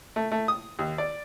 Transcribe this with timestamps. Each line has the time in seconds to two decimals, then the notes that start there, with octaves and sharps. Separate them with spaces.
0.16 A3
0.32 A3
0.48 D#6
0.79 D#2
0.98 D5